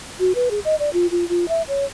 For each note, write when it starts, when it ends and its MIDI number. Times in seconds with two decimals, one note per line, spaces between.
0.20 0.32 66
0.35 0.49 71
0.51 0.60 68
0.65 0.75 75
0.79 0.90 74
0.93 1.07 65
1.11 1.27 65
1.29 1.48 65
1.49 1.62 76
1.68 1.85 73